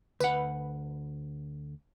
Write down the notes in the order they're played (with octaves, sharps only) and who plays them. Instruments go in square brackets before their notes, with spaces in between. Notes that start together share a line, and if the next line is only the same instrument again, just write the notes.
[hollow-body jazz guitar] D2 F#5 [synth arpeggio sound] B4